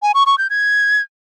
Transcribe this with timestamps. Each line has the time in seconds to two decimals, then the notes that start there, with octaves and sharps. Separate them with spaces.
0.02 G#5
0.14 C#6
0.26 C#6
0.38 G6
0.50 G#6